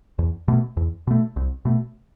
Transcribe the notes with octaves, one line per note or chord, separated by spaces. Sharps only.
E2
B2 A3
E2
B2 A3
C2
B2 A3